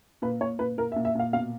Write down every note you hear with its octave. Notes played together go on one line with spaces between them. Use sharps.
A#2 B4
A#2 C#5
A#2 B4
A#2 A#4
E5
A#2
E5
A#2 F5
B2 F5